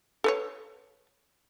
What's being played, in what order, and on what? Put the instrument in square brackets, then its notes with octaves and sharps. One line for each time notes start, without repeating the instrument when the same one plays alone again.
[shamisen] A4 B4 C#5